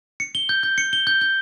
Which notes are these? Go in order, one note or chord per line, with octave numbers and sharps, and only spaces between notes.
C#7
G7
G6
G6
C#7
G7
G6
G6